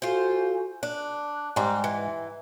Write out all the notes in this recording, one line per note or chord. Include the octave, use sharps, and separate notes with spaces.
F4 F#4 A4 C5 G#5
D4 F#6
G#2 G3 C4
E3